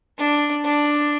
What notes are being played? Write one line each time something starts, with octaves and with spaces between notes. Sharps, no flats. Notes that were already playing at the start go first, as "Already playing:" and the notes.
D4
D4